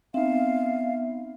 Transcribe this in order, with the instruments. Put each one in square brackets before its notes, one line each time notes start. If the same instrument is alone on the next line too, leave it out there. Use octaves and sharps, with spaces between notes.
[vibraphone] B3 E5 [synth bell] C4 D#4 [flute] F5